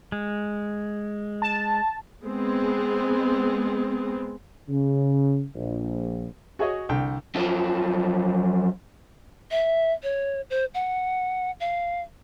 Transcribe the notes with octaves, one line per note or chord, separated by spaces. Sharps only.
G#3
A5
G#3 B3 C4
C#3
A#1
F#4 G#4 C#5 D#5
C2 D3 G5
F#2 F3
E5
C#5
C5
F#5
F5